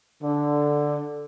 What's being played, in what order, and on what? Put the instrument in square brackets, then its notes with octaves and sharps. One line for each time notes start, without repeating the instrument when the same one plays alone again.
[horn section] D3